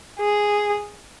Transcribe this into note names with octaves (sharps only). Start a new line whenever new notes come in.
G#4